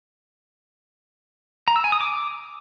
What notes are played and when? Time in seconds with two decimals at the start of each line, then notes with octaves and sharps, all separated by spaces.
1.68 A#5
1.76 E6
1.84 G#5
1.92 D#6
2.01 D6